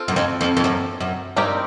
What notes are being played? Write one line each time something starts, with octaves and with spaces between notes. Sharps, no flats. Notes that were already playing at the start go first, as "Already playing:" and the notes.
Already playing: C4 F4 A4
F#2
F2
F2
F2
F#2
F#2
G2 G3 C4 D#4 G4 A#4